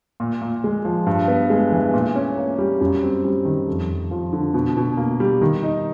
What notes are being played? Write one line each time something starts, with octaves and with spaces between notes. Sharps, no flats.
A#2
A#2
G#3
F3
G2
B3
G#3
E3
A#2
C#4
A#3
G3
F#2
C4
G3
D#3
F2
F2
F3
D3
B2
B2
A#3
G3
D#3
D#4